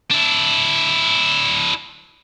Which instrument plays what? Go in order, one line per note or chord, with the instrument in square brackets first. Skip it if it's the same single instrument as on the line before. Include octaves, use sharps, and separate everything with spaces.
[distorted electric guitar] D4 E4